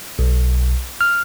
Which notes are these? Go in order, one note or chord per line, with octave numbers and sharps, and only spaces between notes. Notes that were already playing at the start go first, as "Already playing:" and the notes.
B1
F6